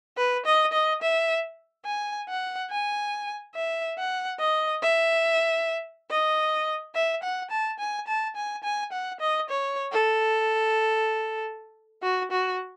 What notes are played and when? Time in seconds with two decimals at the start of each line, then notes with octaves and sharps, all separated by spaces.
0.17 B4
0.46 D#5
0.73 D#5
1.02 E5
1.86 G#5
2.29 F#5
2.71 G#5
3.55 E5
3.98 F#5
4.40 D#5
4.82 E5
6.10 D#5
6.95 E5
7.23 F#5
7.51 A5
7.79 G#5
8.07 A5
8.36 G#5
8.64 G#5
8.92 F#5
9.20 D#5
9.50 C#5
9.92 A4
12.03 F#4
12.31 F#4